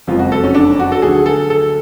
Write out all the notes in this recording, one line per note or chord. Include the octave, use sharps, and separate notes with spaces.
F#1 F2 F3 G#3 F4
F#4
A4
C#4
D4
F#4
A4
D2 D3 F#3 G#4
A4
A4